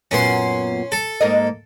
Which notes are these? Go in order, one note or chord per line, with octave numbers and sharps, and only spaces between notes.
F#2 A#2 B3 C#4 C6
A4
G#2 A#3 D#5